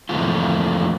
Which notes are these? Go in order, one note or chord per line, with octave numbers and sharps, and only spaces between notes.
F2 E3 A3 A#3 C4 F4